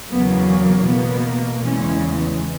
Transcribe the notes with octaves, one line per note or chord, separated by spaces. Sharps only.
E2 C#3 F#3 A#3 B3
B2 A#3 B3
E2 C#3 E3 G#3 C#4